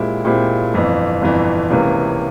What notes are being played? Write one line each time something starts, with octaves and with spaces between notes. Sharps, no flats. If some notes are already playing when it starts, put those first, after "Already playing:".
Already playing: A#2 G#3 C4 E4 G4
A#2 G#3 C4 E4 G4
G1 F2 E3
G1 F2 E3
C#2 C3 E3 A#3 C#4